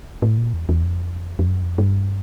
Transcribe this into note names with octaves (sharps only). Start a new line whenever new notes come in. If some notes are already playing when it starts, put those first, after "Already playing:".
A2
A#2
E2
E2
F2
F2
F#2
F2
G2